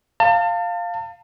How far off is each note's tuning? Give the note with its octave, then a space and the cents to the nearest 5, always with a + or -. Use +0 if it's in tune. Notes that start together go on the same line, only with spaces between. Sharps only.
F5 +0 A5 +35